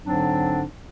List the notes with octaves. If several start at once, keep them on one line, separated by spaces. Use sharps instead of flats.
G#2 D3 F#3 C4 D4